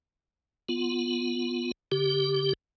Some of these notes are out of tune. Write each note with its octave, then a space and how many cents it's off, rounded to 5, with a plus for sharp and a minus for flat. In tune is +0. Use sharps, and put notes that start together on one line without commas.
B3 +0 F4 +0
D3 -35 G4 -5